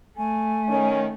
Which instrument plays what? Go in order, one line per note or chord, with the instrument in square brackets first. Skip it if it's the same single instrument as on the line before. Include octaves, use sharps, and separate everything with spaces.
[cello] A3 [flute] G#5
[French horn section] D#3 C#4